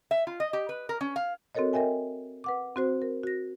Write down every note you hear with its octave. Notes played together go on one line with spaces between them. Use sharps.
E5
F4
D#5
G4
B4
A#4
C#4
F5
C4 F#4 A4 A#4 C#5 D#5
A#4 D#5 E5 G5 G#5
B4 F#5 D6
C4 F#4 C5
A#4
F#4 A#6